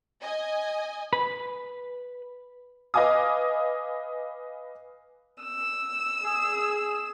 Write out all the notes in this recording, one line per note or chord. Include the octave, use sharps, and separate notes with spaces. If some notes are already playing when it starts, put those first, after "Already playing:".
D#5 G#5
B4 B5
B4 D#5 F5 G#5 D6 D#6
E6
G#4